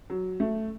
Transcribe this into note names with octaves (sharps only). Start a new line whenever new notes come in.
F#3
A3